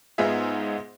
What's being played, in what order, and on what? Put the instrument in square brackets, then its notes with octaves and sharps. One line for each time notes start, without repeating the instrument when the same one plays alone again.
[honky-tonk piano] G#2 B3 D#4 F4 G#4 E5